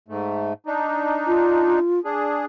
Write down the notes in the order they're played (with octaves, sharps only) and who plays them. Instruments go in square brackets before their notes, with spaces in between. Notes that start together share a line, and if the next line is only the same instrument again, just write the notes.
[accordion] G#2 A3
D4 D#4
[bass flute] F4
[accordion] D4 G#4